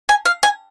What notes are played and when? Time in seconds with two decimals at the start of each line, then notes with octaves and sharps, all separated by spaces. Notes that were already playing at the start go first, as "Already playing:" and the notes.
0.09 G#5
0.26 F5
0.43 G#5